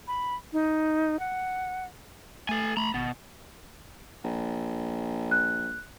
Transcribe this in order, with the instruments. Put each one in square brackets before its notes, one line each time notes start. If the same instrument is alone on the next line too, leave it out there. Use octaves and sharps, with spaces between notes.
[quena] B5
D#4
F#5
[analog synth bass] A3 [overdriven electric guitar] A4 G#5
[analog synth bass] A3 [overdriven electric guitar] A#5 B5
[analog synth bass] G#1 [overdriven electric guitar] B2
[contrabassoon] A#1
[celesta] F#6